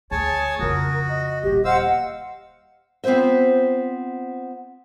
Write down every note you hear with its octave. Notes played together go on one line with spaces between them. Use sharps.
D2 G#4 C#5 G#5 A5
F2 C#3 F#4 A#4 D#6
D#5
D#1 E2 G4
C5 D#5 F5 F#5 E6
B3 C4 F4 C5 E5